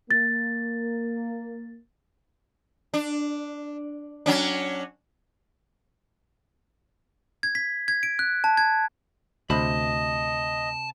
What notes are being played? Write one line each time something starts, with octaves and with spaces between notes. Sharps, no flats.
A#3 A6
D4
F#3 C#4 D4
G#6
B6
G#6
D7
F#6
A5
G#6
D2 C3 C5 D#5 A5 B5